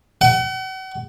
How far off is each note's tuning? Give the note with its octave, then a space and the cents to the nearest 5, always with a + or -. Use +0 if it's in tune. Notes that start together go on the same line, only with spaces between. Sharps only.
F#5 +40